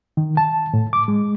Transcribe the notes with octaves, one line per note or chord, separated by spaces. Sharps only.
D#3
A5
A2
D6
G#3